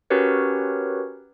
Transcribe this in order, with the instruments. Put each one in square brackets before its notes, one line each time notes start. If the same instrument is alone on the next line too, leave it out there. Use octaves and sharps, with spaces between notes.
[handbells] C#4 F#4 G4 A#4 B4 C#5